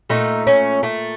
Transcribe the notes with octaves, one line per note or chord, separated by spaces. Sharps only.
A#2 A3 D#4
C#4
A3